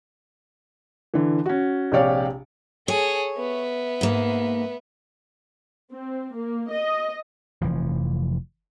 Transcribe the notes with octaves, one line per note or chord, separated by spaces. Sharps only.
D3 E3
C#4 F#4
A#1 C3 G4 C#5 D5 F5
G#4 A4 C#5
B3 E5
G#2 A#3
C4
A#3
D#5
F1 E3 F3